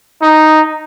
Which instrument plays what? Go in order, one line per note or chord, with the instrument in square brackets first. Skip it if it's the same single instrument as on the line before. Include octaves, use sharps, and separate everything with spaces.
[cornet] D#4